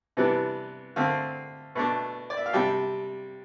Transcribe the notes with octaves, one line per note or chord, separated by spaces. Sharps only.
C3 E3 G3 B3 D4
D3 A3 C4 F5
B2 A3 D4
D5
E5
F5
C3 G3 D4 G5